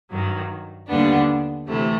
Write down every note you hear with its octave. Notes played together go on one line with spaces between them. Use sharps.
G2 D#3 F#3
D#2 D3 G3 B3 D4
D2 C3 E3 A3